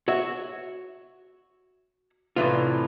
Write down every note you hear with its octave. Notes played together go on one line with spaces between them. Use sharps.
F#4 C#5 E5
C2 A2 E3 F4